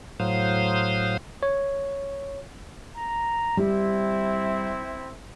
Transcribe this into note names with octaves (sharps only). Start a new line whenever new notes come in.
A2 F#3 C5 F5 D#6
C#5
A#5
G3 C4 E4